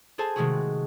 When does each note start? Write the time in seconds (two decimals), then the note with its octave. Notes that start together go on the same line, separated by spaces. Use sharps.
0.18 G#4 A4 C5 G#5 A5
0.36 C3 D#3 G#3 A3 F#4 G#4